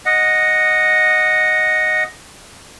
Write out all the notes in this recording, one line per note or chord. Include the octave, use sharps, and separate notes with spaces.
D#5 F#5